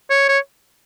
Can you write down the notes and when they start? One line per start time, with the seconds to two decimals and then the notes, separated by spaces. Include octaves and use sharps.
0.10 C#5
0.29 C#5